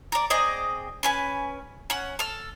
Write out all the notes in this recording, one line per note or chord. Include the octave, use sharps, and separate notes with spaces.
A#4 D5
C4 G#4 D5 D#5
C#4 B4 G#5
C#4 F#5
A4 F6